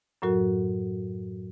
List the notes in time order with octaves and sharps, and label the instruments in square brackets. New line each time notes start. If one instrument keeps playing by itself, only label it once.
[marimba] F#2 A2 F#3 F#4 A#4